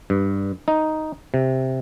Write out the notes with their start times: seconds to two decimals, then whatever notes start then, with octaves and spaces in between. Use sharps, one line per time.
0.10 G2
0.68 D#4
1.34 C3